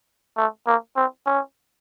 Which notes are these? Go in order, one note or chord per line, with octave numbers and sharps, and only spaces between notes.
A3
A#3
C4
C#4